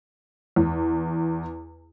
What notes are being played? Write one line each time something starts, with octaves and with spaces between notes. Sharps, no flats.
E2